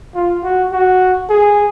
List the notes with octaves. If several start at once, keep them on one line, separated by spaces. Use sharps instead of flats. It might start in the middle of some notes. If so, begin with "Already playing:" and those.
F4
F#4
F#4
G#4